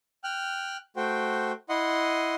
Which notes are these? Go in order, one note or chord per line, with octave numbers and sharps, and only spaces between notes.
G5 F6 F#6
A3 F#4 C5 G5
E4 D#5 F#5 C6